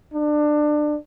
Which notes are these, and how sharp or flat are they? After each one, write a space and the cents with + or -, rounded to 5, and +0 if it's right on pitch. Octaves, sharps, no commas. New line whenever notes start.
D4 +25